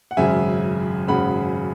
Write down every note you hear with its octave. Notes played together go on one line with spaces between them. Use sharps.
F#5
G#1 F#2 C#3 E5 G#5
G#1 F#2 C#3 F#5 B5